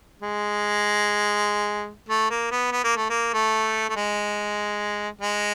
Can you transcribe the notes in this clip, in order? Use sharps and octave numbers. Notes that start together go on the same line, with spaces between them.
G#3
A3
A#3
B3
B3
A#3
A3
A#3
A3
A3
G#3
G#3